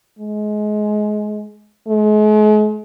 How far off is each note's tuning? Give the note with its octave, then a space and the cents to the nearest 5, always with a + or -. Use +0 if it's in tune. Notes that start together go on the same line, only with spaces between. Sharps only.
G#3 +25
G#3 +40